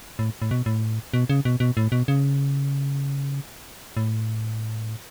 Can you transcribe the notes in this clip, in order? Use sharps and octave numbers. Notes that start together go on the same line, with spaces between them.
A2
A2
B2
A2
B2
C#3
B2
B2
A2
B2
C#3
A2